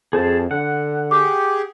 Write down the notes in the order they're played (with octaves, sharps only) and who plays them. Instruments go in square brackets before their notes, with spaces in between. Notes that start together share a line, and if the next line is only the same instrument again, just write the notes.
[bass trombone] F2 [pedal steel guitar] G#4 C5 A5
[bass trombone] D3 [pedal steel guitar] F#5
[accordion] G4 G#4 [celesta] D6